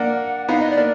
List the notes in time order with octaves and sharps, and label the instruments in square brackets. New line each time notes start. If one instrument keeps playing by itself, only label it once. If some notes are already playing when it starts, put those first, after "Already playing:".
Already playing: [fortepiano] A#3 D4 [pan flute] F#5
[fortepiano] B3 D#4 [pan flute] F5
[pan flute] D#5
D5
[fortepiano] A#3 D4